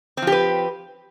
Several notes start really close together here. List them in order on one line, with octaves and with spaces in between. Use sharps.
C4 F3 G4 B4